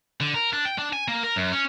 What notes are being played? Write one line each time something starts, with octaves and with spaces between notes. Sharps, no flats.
D3
A#4
D4
G5
D4
G#5
A#3
A#4
F#2
C#4